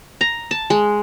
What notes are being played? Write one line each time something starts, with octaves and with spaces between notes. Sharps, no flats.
A#5
A5
G#3